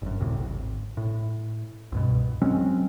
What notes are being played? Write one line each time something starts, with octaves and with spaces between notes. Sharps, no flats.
G1 F#2
D2 A2 C3
G#1
A2
C2 G2 B2
F#3 G#3 C4 C#4